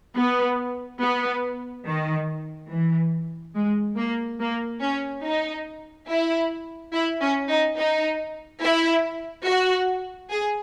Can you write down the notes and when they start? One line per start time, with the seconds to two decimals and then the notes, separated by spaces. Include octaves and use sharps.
0.17 B3
1.02 B3
1.86 D#3
2.70 E3
3.55 G#3
3.97 A#3
4.40 A#3
4.81 C#4
5.24 D#4
6.09 E4
6.93 E4
7.21 C#4
7.49 D#4
7.78 D#4
8.62 E4
9.46 F#4
10.31 G#4